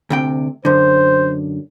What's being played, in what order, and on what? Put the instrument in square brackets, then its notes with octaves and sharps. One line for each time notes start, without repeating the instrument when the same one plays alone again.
[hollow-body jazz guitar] D2 C3 G5
[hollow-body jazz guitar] F#2 D3 [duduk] C5